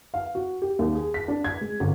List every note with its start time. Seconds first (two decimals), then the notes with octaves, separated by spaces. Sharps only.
0.14 F5
0.35 F#4
0.62 G4
0.79 D#2
0.95 G#4
1.14 B6
1.28 D4
1.44 G#6
1.61 G#3
1.80 G1